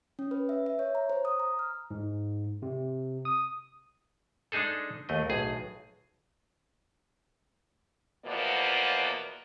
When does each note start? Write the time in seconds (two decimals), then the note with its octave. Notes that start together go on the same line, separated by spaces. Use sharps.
0.19 C#4
0.31 B4
0.49 E5
0.66 E5
0.79 C#5
0.95 A#5
1.10 C5
1.25 D#6
1.40 A#5
1.59 F6
1.91 G#2
2.62 C3
3.25 D#6
4.52 G#3 D4 D#4 G#4 A4
5.09 D#2 A3 D#5
5.30 B1 A2 G#4
8.26 E2 B2 F3 A#3 B3 D5